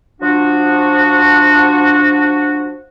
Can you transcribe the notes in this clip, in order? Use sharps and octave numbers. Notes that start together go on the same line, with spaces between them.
F3 D4 F#4